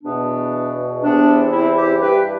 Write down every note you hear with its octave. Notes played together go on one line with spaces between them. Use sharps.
E2 B2 B3 D4
E2 C3 E3 B3 D4
C4 E4
E4 G4
G2 E3 G4 B4